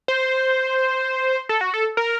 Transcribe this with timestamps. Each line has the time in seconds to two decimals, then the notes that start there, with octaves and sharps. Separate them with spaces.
0.08 C5
1.49 A4
1.61 F#4
1.74 A4
1.97 A#4